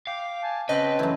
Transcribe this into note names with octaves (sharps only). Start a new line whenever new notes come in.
F5 G5 D6
G#5 A5
C#3 C4 B4 D#5 G5 A5
F#2 E3 A3